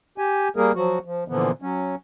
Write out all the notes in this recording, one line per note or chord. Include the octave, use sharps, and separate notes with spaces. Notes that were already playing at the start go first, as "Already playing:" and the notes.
G4 G#5
G3 A#3 G#4 A#4
F3 F#3 F#4
F3
A#2 D3 E3 F3 B3
F#3 C#4